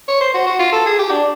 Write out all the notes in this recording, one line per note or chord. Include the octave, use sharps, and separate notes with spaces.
C#5
C5
F#4
F#4
F4
A4
G#4
G4
D4